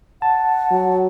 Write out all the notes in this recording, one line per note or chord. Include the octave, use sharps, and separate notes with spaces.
F#5 A5
F#3